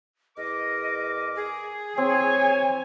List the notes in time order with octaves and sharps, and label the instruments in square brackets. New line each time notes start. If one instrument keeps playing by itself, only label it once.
[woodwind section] E2 A#4 D6 [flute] D#5
[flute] G#4
[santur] C4 [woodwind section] C#5 [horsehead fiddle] G#5